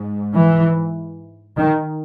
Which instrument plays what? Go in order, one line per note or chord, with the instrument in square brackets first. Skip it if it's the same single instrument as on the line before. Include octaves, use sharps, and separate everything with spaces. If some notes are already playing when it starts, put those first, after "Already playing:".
Already playing: [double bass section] G#2
E3
D#3